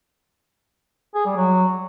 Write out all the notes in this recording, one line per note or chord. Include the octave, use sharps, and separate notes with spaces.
G#4
G3
F#3